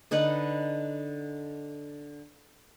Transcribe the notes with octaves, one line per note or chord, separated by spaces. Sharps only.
D3 D#4 B4 F#5